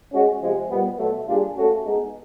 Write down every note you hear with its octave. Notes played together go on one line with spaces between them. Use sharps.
G#3 C#4 F#4
C3 F3 G#3
A#2 G3 B3
B2 F#3 A3
G3 A#3 D4 F4 G#4
A3 C#4 F#4 A4
G#3 B3 D#4